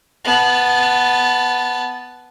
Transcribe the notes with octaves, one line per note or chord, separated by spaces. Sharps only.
B3 A5